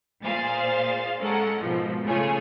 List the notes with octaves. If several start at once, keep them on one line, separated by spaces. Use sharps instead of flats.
A#2 G#4 C5 F5 A6
G#3 C#4 A4 A#4 F#5
G#2 B2 F3
C#3 A3 F4 G#4 C#5 G#5